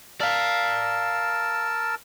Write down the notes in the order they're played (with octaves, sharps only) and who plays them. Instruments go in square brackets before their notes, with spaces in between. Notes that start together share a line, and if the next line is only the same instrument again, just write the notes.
[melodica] A#4 A5 E6 [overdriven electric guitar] D5 F5